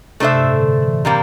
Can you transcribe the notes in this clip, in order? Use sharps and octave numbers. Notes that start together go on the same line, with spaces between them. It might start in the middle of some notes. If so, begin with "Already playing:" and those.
C3 A3 D4 A4 C5 E5
G2
A2
D3
C3
E3
C3 G3 A#3